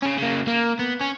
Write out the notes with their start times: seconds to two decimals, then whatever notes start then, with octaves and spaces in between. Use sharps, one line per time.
0.03 C#3 C#4
0.18 C#3 A#3
0.48 A#3
0.79 B3
1.01 C#4